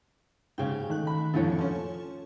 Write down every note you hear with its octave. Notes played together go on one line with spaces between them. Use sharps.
G#2 C#3 G5 G#5
D#3 A3 F#6
B5
F2 A2 D3 A4 C#5
F3 C#4